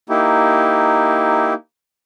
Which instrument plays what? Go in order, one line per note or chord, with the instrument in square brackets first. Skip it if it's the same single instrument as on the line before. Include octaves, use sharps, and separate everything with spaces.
[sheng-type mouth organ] A#3 D#4 E4 G4